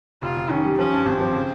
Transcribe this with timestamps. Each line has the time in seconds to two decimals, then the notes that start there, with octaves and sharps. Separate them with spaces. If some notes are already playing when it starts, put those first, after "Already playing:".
0.22 F1 F4
0.36 F1
0.50 D#3 C#4
0.65 G3
0.78 F3 C#4
0.93 G2
1.06 G#1 C4
1.20 F3
1.34 C#3